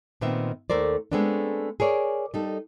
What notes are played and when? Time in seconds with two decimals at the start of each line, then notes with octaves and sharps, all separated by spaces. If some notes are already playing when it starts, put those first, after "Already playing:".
0.21 A#2 D#3 B3 C4 E5
0.70 D#2 A3 A#4 C5 D5
1.12 G#3 A3 B3 C4 D4
1.80 G#4 A#4 C#5 D5
2.34 G3 D#4 A4